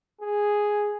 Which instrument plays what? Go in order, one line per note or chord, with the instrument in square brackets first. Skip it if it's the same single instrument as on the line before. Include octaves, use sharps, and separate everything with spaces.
[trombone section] G#4